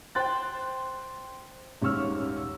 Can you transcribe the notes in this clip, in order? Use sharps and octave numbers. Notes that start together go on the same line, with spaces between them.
C5 G5 C6 F#6 A6
D#1 G#2 C#4 C#6 E6 F6